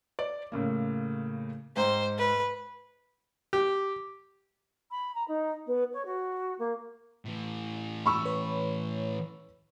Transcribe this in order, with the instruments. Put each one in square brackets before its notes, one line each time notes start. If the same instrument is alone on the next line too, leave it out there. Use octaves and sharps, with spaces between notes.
[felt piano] D5
A2 C#3 A#3
[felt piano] G#2 G5 A#5 [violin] C5
[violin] B4
[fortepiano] G4
[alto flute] B5
A#5
D#4
B3
C#5
F#4
A#3
[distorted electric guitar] A2 E3
[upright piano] B5 C#6 E6
[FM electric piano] B4 C#5